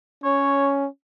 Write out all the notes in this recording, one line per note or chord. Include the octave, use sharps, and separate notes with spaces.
C#4 C#5